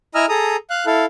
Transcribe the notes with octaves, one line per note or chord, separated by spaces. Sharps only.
E4 D#5 G#5 A#5 E6 F6
G#4 A4 A#5 D#6
F5 F#6
E4 A4 F5